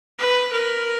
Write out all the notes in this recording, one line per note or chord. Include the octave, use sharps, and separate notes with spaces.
B4
A#4